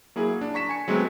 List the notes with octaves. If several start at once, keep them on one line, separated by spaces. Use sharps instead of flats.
F#3 A#3 E4 G#4
D4
A#5 C#6 B6 E7
G#5 C#7
F#3 G#3 A3 B3 C4 F#4